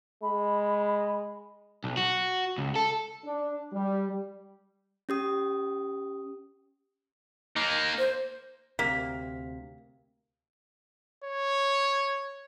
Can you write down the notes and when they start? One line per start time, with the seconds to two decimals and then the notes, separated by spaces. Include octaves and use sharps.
0.23 G#3 B5
1.84 B1
1.97 F#4
2.58 C#2
2.76 A4
3.26 D4
3.73 G3
5.09 C#4 G4 D#6
7.56 A#3 D#4
7.98 C5
8.79 D2 C3 A#3 B6
11.24 C#5